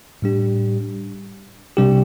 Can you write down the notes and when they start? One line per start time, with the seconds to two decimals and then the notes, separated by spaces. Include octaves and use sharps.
0.22 A2 G3 D4 G4
1.77 C3 G3 D4 G4